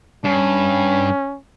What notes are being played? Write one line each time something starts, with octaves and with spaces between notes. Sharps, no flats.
G2 C#4